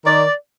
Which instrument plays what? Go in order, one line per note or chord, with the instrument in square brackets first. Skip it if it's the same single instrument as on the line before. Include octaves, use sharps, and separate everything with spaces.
[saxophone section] D#3 D5